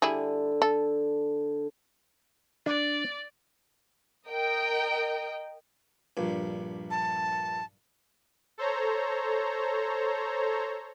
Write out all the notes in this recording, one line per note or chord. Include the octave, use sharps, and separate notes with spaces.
D3 G3 E4 G#4
A4
D4 D5
A#4 D#5 G5
A#1 G2
A5
A4 C5 C#5 A#5